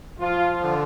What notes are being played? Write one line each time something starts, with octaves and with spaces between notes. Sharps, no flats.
F3 F4
D3